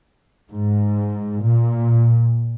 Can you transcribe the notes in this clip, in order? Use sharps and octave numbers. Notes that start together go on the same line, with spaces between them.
G#2
A#2